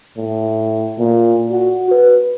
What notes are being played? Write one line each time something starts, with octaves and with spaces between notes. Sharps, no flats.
A2
A#2
F#4
B4